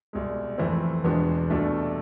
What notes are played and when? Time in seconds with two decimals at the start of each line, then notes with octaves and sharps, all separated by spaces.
0.13 C2 B2 G#3
0.58 F2 E3 A3 C4
1.04 E2 B2 G#3 B3 D4
1.49 C2 B2 A3 D4 A4